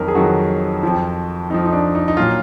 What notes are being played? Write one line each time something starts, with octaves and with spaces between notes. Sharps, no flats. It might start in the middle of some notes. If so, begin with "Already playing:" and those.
Already playing: F2 D#3 F#3 A#4
G#4
F2 D#3 F#3 F#4
F2 F3
F2 F3 D#4
D#4
D4
D#4
D#4
A#2 F#3 F4